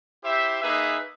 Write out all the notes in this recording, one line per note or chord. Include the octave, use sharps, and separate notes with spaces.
E4 G4 C5 E5
A#3 D#4 G#4 B4 E5